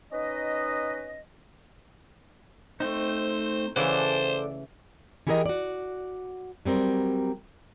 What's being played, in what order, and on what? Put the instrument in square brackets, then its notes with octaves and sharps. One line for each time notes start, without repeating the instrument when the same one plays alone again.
[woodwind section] C#4 D#4 B4 D#5
[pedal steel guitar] A3 C4 D#4 [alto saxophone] C5
[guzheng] C#3 E3 A3 [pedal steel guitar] A4 D5 F#5 [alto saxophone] C5
[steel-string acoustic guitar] E3 E4 G4 G#4 A#4 D#5
F#4 D5
F#3 G3 C4 A#4